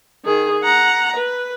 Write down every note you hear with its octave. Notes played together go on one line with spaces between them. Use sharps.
D#3 G#4
F#5 A#5
B4